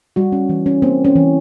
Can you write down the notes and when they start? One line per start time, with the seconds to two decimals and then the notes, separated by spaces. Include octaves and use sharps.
0.16 G3 F#4
0.32 C#4
0.49 E3
0.66 C#4
0.82 A#3 C4
1.05 C#4
1.16 E3